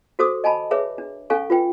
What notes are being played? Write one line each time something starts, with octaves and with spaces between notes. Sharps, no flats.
F#4 A4 C5 D6 D#6
D#5 G#5 A5 B5
G#4 B4 C#5 E5 D6
D4
C#4 A4 F5 G#5 C#6
F4 B4 G5